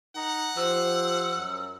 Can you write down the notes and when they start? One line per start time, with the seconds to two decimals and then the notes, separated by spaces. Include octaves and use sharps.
0.16 D#4 F#5
0.57 F3 G4 C5 E6
1.35 F#2